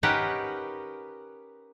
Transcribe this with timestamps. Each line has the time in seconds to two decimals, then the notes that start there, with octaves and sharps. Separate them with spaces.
0.03 C#4 D#4 G4 A#4 B4 F#5